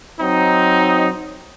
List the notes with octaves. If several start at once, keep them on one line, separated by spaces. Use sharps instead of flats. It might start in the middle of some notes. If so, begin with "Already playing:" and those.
F#3 C4 D#4